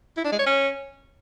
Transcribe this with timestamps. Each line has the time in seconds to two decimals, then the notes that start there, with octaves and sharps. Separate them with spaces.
0.17 E4
0.24 D4
0.32 G#3
0.39 C#5
0.46 C#4